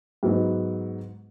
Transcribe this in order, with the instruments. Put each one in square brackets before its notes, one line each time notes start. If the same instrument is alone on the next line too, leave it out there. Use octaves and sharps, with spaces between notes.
[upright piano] G#2 F#3 B3 D#4